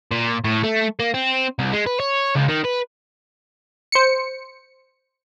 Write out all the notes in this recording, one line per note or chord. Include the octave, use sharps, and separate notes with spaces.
A#2
A2
A3
A#3
C4
C2
G#3
B4
C#5
C#2
D#3
B4
C5 C#7